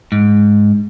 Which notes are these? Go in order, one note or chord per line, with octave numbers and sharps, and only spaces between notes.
G#2